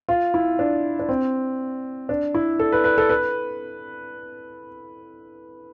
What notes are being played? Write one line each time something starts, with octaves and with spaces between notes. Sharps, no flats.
F4
E4
D4
D4
C4
D4
E4
A4
B4
B4
A4
B4